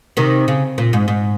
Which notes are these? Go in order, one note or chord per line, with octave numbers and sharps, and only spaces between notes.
C3 D#3
C#3
A#2
G#2
G#2